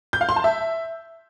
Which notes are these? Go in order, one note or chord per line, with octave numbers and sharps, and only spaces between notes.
G6
F5
C6
A5
E5